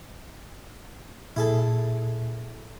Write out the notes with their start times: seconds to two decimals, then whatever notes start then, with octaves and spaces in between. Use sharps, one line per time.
1.36 A#2 E4 G#4 A4